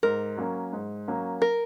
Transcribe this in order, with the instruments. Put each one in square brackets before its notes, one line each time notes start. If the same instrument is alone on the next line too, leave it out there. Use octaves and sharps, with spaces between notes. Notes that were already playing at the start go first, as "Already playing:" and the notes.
[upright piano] G#2 [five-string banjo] A#4
[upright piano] F#3 A#3 C#4
G#2
F#3 A#3 C#4
[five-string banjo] A#4